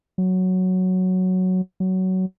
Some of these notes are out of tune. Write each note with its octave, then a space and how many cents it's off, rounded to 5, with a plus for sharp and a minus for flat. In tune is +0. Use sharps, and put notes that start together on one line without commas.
F#3 +0
F#3 +15